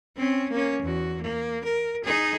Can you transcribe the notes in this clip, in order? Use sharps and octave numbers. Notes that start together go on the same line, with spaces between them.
C4 C#4
A#3 C#4
E2 F#4
A#3
A#4
D#4 G#4